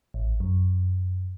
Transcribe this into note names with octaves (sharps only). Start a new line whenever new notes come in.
A1
F#2